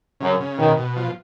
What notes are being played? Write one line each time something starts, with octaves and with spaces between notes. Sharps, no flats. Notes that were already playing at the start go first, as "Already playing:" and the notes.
F#2 C#3
C#3
B2 D#3
B2
F3